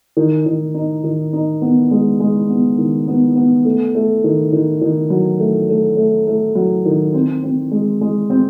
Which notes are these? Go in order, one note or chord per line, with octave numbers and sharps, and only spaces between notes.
D#3
D#3
D#4
D#3
D#4
B3
G#3
G#3
B3
D#3
B3
B3
A3
A3
D#3
D#3
D#3
F#3
A3
A3
A3
A3
F#3
D#3
C4
C4
G#3
G#3
C4